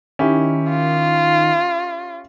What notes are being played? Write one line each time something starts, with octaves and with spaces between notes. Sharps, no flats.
D#3 C#4 E4 G4
F4